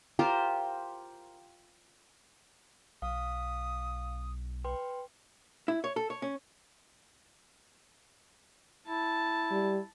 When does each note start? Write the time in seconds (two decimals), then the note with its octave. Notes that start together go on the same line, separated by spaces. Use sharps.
0.19 F4 G4 A#4 C5
3.02 B1 F5 D#6
4.65 B4 G5 C6
5.68 E4
5.84 C#5
5.96 A4
6.10 C#5
6.22 C#4
8.88 E4 A5
9.52 G3